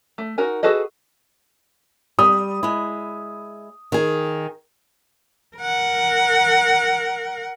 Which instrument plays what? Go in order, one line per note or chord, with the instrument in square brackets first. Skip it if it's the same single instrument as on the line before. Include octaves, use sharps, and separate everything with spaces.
[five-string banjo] A3
D#4 F#4 A#4 G#5
F#4 G#4 A4 B4 D#5
[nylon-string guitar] G3 [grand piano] D#6
[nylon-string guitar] G#3 E4
D#3 G#4
[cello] A#4 F#5